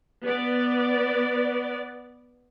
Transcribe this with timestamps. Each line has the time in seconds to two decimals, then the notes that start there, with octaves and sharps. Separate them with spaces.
0.22 B3 D5